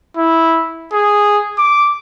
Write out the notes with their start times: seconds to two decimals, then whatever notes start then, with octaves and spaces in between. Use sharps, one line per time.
0.17 E4
0.93 G#4
1.58 D6